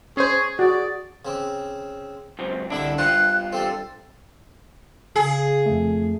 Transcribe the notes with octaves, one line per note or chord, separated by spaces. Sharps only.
C#4 G#4 C5 C#6
F#4 G#4 D5
C#3 C4 D6
C#2 F#2 C4
C2 D3 D4 E4 E5
G2 F4 C5 G5 A5 F#6
C4 G4 A4 F5
C#3 G#4 G#5
F2 A3